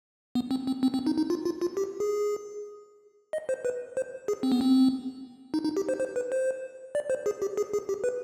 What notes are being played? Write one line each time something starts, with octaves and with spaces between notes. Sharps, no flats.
B3
C4
C4
C4
C4
D#4
D#4
F4
F4
F4
G4
G#4
D#5
C5
B4
C5
G#4
C4
B3
C4
D#4
D#4
G4
C5
C5
B4
C5
D5
C5
G#4
G4
G#4
G#4
G4
B4